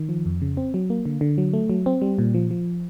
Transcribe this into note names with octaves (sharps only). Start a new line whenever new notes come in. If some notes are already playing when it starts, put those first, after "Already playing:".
Already playing: D#3
F3
F2
C#3
C4
F#3
A#3
D3
D3
F#3
A3
F#3
C4
G3
A#2
F3
F3